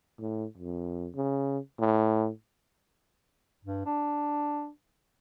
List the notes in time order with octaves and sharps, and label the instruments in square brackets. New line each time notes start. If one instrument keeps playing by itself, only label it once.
[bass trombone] A2
F2
C#3
A2
[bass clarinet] G2
D4